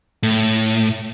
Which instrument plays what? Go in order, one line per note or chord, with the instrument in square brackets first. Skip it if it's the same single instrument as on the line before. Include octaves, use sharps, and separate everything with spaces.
[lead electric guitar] A2